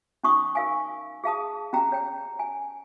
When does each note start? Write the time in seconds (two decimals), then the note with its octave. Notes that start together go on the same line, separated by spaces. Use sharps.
0.23 C#4 D#4 C#6 D#6
0.55 A#4 F5 G#5
1.24 G#4 F5 A5 D#6
1.73 C#4 G4 G5 A#5
1.92 C#5 G5
2.39 G#5